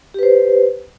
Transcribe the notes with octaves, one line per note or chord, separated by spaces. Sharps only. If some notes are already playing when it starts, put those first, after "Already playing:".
G4 B4 C5